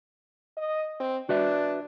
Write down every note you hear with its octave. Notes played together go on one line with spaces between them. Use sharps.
D#5
C4
D4 F#4 B4 E5